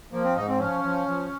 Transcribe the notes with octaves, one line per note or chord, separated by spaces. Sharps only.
F3 A#3
C4
G#2 D#4
C4
F3 C#4
F3
F3